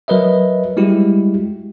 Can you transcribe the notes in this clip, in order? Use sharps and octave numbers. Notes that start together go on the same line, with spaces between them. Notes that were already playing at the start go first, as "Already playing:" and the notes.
F#3 A#4 B4 D#5 E5
G3 G#3 E4 F#4 G4